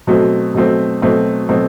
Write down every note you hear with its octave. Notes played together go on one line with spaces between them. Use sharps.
B2 F#3 A3 C4
B2 F#3 A3 C4
B2 F#3 A3 C4
B2 F#3 A3 C4